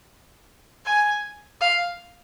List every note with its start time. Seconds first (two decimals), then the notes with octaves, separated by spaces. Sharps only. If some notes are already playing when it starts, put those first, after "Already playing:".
0.86 G#5
1.61 F5